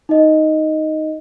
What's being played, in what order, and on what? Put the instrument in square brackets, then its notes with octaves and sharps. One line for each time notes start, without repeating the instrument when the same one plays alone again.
[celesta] D#4 D#5